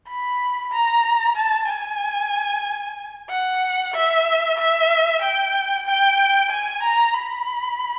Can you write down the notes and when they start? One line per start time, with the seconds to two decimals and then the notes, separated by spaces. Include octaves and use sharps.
0.08 B5
0.72 A#5
1.36 A5
1.68 G#5
3.29 F#5
3.94 E5
4.58 E5
5.22 G5
5.86 G5
6.51 G#5
6.83 A#5
7.14 B5